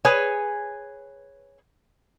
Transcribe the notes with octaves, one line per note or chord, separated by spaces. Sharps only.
G#4 B4 C#5 G#5